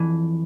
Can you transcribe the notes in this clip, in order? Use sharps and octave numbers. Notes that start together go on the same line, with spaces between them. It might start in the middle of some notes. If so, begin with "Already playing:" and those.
Already playing: F2 E3